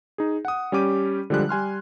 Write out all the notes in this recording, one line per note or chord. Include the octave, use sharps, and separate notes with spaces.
D#4 G#4
F#5 D#6
G3 C#4 G4 D6 D#7
D3 F3 G3 G#3 F#6
G3 G#5 C6 F6